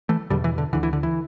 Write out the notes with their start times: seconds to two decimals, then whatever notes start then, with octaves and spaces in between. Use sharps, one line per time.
0.09 E3 A3
0.30 E2 B2 D3 G3
0.44 E3
0.58 D3
0.73 D2 D3 E3
0.83 E3
0.93 D3
1.03 E3